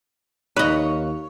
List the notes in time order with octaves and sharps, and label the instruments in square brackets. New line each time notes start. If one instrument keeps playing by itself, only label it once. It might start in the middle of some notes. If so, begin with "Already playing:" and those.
[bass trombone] D#2 [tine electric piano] D#4 F5 [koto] B4 D#5 [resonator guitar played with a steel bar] C#5